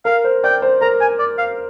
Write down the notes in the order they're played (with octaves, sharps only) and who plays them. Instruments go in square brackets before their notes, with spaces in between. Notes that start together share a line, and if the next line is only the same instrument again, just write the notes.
[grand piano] A#4 [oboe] F5
[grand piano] C5
[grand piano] D5 [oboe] G5
[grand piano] C5
[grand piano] A#4 [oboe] A#5
[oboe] G#5
D5
F5